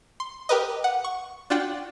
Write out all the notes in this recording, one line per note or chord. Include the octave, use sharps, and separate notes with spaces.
C6
G4 A#4 B4 D#5
F#5
C#6
D4 F4 F#4 G5